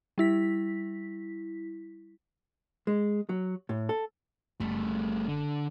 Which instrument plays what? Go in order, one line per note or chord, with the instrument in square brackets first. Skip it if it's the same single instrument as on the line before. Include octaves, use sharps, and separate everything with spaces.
[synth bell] G3 E4 B6
[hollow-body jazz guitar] G#3
F#3
A2
A4
[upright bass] F#1 [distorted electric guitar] G3 A3
[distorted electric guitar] D3